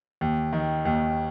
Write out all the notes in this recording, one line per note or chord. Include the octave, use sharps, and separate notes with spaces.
D#2
D#3
D#2